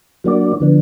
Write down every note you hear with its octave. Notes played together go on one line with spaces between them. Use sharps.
F#3 A#3 D4 F#4 D5
D3 F3 B3 D4